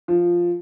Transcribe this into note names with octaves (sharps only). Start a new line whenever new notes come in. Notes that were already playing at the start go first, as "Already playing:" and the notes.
F3